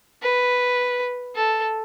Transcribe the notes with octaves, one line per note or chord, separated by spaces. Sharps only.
B4
A4